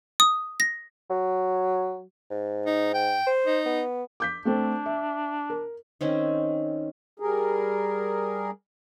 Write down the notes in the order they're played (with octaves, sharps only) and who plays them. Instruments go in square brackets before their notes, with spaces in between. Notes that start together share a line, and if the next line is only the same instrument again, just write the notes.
[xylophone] D#6
A#6
[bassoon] F#3
G#2
[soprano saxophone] D#4
G5
[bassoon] C5
[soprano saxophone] D#4
[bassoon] B3
[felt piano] D6 G6 B6
[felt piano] A3 C4 A4 [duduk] D4
[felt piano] E5
A#4
[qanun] D#3 C4 C#4 G#5
[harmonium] G3 G#4 A#4